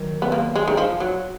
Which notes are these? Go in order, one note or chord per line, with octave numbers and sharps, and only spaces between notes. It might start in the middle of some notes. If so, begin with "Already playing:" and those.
Already playing: D#3 F#3
B3
A#3
G#3
D#3
F3
F#3